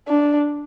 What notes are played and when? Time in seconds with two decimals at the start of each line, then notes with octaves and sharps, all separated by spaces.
0.08 D4